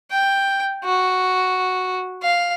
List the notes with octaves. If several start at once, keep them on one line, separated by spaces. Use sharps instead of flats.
G5
F#4
F5